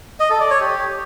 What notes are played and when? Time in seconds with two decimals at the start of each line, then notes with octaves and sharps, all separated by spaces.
0.20 D#5
0.30 A4
0.40 D5
0.50 C#5
0.61 G4